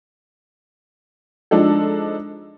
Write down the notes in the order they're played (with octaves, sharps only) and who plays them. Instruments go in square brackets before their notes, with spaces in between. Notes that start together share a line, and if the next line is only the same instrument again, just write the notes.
[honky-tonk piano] F3 G#3 D4 D#4 A4